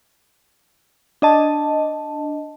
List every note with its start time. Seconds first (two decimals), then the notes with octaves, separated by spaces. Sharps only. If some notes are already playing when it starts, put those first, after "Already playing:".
1.22 D4 D#5 A5